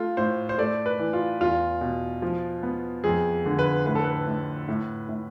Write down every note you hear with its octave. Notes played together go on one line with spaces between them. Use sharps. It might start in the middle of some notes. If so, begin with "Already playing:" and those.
Already playing: A3 F4
A2 C5
C5
A3 D5
B4
E3
F4
E2 F4
B2
F3
B3
F2 G#4
D3
B4
A2 B4
A4
B4
A2
A2
A2